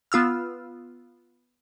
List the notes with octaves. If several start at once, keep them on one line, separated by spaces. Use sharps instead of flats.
B3 F4 E6 F6